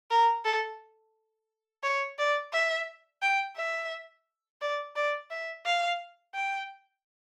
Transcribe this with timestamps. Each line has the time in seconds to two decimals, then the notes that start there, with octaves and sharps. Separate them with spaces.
0.11 A#4
0.45 A4
1.83 C#5
2.18 D5
2.53 E5
3.22 G5
3.57 E5
4.61 D5
4.96 D5
5.30 E5
5.65 F5
6.35 G5